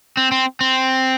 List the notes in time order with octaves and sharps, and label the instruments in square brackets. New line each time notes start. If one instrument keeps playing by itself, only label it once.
[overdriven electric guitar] C4
C4
C4